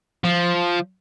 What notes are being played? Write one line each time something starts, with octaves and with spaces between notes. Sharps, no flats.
F3